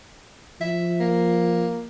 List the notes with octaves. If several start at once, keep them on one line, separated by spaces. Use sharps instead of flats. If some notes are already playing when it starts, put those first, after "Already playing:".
F3 E5
A#3